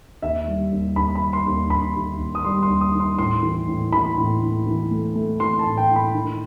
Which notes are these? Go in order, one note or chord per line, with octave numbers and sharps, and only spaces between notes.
D#2 E5
G3
D#2
D#2 B5
B5
G3
C6
D#2
D#2 B5
D#2
D#2
D#6
G3 C6
C6
D#2
D#6
D#3
C6
A2 C6
E3
A2
E3 B5
A2
A2
E3
A3
A3
E3 C6
A5
A2
G5
A2
B5
D#3